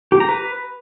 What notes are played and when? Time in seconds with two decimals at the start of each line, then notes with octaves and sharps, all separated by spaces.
0.12 G4
0.20 A#5
0.29 B4